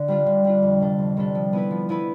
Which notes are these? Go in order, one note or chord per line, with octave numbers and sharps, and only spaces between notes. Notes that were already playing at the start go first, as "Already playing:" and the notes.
Already playing: D3
G3 D4 F4
D3
G3 D4 F4
F2
C3 G3 D4 A4
F2
C3 G3 D4 A4
F3
B3 E4 B4
F3
B3 E4 B4